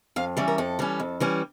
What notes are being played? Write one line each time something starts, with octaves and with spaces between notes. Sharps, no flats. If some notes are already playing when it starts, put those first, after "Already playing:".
F2 F5
E3 G3 C#4 D5
A#4
F2 A4
E3 G3 C#4
F2
E3 G3 C#4